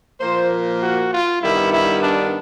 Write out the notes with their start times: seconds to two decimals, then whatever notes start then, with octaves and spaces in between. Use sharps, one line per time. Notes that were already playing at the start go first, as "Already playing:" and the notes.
0.20 A#2 F3 A#3 C5
0.81 F#4
1.11 F4
1.41 G2 D#3 G3 B3 E4
1.71 E4
2.02 D4